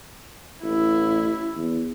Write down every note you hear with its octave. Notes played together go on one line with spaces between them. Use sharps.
A1 E4
E2